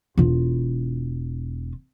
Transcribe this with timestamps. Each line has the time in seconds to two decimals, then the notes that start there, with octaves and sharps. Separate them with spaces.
0.17 E1 F4